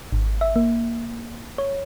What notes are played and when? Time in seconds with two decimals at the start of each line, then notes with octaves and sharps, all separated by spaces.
0.12 G#1
0.41 E5
0.56 A#3
1.58 C#5